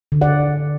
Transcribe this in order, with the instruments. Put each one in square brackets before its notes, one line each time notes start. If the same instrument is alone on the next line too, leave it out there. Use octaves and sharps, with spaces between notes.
[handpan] D3
D5 F#5